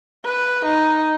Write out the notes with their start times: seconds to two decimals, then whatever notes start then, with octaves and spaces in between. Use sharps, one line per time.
0.25 B4
0.65 D#4